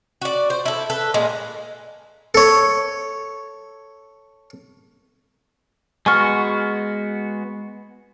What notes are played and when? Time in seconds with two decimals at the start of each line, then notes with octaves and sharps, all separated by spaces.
0.22 F#4 D5
0.50 C5
0.65 E4 A4
0.90 A4 B4
1.14 A#2 G#3
2.35 A4 C#5
6.06 G#3 B3 F#4 G#5 C#6 F6